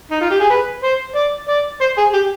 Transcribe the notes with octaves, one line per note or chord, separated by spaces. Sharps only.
D#4
F4
G4
G#4
B4
C5
D5
D5
C5
G#4
G4